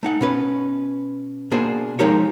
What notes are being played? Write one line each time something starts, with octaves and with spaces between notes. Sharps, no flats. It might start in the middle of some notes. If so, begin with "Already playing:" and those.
A3 D#4 F#5
B2 C#4 B4
B2 A#3 D4 G#4 C5
F3 G#3 D#4 G4 A#4 C#5